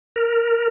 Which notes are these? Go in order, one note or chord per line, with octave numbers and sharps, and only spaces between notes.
A#4